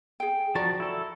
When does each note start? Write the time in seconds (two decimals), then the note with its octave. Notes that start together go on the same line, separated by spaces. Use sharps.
0.20 G#4 G5
0.55 F3 F#4 D5 A5 A#5 C#6
0.80 E4 A4